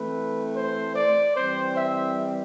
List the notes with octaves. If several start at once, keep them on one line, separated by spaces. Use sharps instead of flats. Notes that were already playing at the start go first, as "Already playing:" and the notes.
Already playing: E3 A3 C4 B4
C5
D5
E3 G3 C4 C5
E5